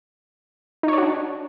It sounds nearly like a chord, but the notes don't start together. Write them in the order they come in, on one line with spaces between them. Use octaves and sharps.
D#4 C#5 D5 F#4 D4